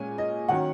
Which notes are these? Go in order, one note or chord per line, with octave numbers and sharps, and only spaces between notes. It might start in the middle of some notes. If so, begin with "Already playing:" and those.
Already playing: A#2 G#3 C#4 G#5
D#5
D#3 F#3 C#4 F#5